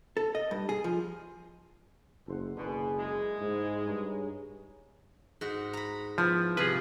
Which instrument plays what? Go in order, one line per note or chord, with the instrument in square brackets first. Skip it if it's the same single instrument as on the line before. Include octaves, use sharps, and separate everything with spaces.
[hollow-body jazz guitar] A4
D#5
G2
G#4
F3
[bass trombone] F#1 [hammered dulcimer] A4 C5 F#5
[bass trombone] F#1 [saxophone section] B2 [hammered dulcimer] D3 G#4 B4
[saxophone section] G#3 [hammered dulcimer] E4
[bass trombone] G#2
[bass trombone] G2 [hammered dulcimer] C#3 D#4 C#5
[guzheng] G#2 F#4
A#5 B5
[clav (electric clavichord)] F3 [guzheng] B3 E4
[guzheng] C3 F3 G3 [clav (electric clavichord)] G#4 B4